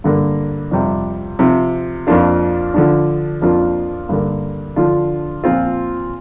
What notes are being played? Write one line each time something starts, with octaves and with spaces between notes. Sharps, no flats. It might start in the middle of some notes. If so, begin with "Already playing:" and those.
G2 D3 A#3
F2 C3 G3
C3 F3 C4
F2 F3 A#3 D4 F4
D3 F3 D4
F2 F3 A#3 D4 F4
G2 D3 A#3
D3 F3 D4 F4
A#2 F3 C4 F4